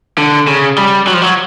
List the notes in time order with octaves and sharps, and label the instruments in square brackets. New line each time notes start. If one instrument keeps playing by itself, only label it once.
[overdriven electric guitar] D3
C#3
G3
F#3
F3
F#3